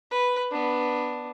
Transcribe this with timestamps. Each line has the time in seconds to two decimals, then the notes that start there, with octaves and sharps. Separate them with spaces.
0.11 B4
0.51 B3 D4